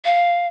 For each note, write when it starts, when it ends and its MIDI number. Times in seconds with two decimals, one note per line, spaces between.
0.05 0.47 77